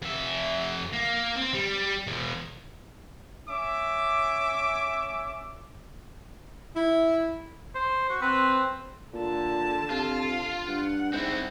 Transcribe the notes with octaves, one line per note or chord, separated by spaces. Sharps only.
F2 E5
A#3
C4
G3
E2 B2
C#4 E5 D6
E4
C5
F#4
C4 B4
A#2 D3 A5
C3 F4
G2 F#5
G#2 C4 E4